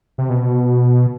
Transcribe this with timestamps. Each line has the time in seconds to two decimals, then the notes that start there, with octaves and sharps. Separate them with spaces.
0.18 C3
0.30 B2